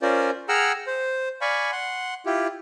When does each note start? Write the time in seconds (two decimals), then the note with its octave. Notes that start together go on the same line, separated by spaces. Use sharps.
0.02 C#4 F4 A#4 C5 D5
0.49 G#4 F#5 G5 A#5 E6 F6
0.87 C5
1.41 D5 F5 G#5 B5 C#6
1.72 F#5 C6
2.26 E4 F4 G4